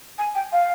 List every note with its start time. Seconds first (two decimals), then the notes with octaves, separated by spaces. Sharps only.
0.18 G#5
0.35 G5
0.52 F5